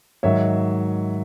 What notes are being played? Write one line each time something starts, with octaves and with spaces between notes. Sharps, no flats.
G#2 D#3 F#3 C#5 E5